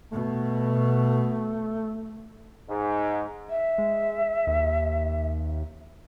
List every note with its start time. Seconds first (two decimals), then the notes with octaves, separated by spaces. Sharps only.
0.12 B2 A3
2.69 G#2
3.50 E5
3.78 G#3
4.47 D#2